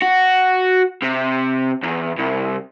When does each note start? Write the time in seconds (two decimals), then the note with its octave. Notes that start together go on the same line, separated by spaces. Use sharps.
0.02 F#4
1.03 C3
1.84 E2
2.19 C2